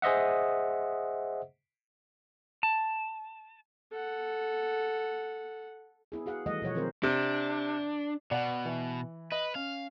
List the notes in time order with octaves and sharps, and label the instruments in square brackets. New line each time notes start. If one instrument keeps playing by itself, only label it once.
[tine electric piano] G#4 C5 D#5 E5 F#5
[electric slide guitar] A5
[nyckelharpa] A4 F#5
[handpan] B3 E4 G#4
F#4 G#4 F5 F#5
D#3 E3 G3 A3 D#5 F#5
B2 F3 C#5 F#5
D#3 F#3 C4 G#4 A#4 C5
[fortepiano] C3 [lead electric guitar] D4
[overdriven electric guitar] B2 [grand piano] D5 F#5
[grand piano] E3
[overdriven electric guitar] B4 [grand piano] D#5
[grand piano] C#4 [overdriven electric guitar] F5